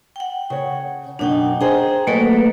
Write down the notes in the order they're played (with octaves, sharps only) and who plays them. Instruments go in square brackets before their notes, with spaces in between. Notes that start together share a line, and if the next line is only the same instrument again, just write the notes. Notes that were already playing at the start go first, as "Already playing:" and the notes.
[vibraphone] F#5 G5
[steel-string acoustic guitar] C#3 C#5
[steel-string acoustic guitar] F#2 B2 D#4 [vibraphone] D4 F#5 G5
[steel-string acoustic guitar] D#4 G#4 C5 [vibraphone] G5 A#5
[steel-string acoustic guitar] F#3 B4 D#5 [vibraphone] A3 A#3 A4